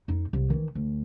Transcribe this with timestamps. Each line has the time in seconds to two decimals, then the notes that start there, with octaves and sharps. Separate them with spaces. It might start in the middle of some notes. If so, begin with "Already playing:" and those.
0.08 F2 D#4
0.33 C2
0.50 D#3 E3
0.75 D2